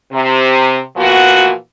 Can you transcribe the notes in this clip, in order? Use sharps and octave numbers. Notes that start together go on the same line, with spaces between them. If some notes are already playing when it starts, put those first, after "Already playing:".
C3
A#2 E3 F3 B3 F#4